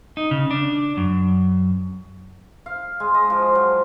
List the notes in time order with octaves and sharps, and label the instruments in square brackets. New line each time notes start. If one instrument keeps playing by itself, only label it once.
[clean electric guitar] D#4
C#3
D4
F#2
[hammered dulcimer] F5
G#3
D#5
F3
F#3